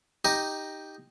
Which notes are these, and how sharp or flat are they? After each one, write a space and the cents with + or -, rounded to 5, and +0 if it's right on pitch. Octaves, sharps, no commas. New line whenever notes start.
D#4 +0 G4 +0 D#5 +0